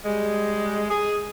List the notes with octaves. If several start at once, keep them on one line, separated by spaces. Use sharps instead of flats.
G3 G#3
G#4